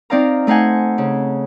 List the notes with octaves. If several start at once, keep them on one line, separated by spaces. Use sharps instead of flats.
C4 D#4 D5 F5 A#5
A3 D#4 C5 F#5 G#5
C#3